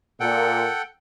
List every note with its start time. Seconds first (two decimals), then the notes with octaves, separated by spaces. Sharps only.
0.20 A#2 A4 F#5 G5